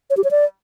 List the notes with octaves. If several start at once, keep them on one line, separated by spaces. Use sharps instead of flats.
C#5
G4
C#5
D5